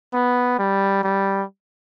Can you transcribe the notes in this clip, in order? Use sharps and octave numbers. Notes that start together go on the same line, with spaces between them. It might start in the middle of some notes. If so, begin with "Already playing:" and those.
B3
G3
G3